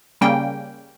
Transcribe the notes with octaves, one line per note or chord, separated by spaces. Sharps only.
C#3 G3 A#3 C#4 G5